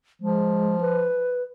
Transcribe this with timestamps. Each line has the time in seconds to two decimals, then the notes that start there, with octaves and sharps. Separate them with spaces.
0.22 F3 G#3
0.81 B4